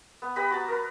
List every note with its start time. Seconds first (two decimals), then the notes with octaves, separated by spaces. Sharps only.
0.22 B3
0.36 G4 B4 D#5 B5
0.51 F#4 A5 A#5
0.68 A#4 B4